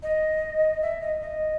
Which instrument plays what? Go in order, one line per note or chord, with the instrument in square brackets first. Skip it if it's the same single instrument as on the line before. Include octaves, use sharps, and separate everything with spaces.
[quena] D#5
E5
D#5
D#5